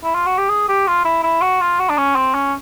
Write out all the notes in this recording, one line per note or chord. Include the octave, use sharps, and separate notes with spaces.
E4
F4
F#4
G4
G#4
G4
F4
E4
E4
F#4
F4
F#4
D4
C#4
C4
C#4